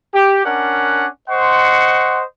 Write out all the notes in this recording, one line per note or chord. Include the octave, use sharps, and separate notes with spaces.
G4
C#4 D4 A#4 F#5
C5 D#5 F#5 C6 C#6